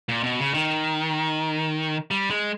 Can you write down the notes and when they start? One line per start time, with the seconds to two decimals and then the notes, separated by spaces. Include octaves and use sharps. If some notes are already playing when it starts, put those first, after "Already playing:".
0.09 A#2
0.23 B2
0.39 C#3
0.54 D#3
2.11 G3
2.31 G#3